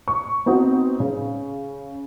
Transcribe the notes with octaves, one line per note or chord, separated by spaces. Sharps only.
C#6
B3 C4 D#4 F#4
C#3